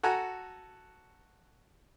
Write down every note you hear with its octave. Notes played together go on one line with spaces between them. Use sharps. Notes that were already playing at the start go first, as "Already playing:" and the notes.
F#4 A4 F#5 G#5 A#5